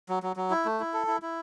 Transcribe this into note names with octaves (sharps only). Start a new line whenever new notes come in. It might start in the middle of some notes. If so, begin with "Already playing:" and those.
F#3
F#3
F#3
E4
A3
E4
A4
E4
E4